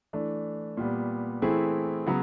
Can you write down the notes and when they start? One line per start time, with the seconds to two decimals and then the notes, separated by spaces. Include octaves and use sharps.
0.13 E3 A3 D4
0.77 A#2 G3 B3
1.42 E3 A3 C4 E4 G#4
2.06 C#3 F#3 B3